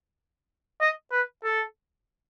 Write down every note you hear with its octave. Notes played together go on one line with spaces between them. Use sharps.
D#5
B4
A4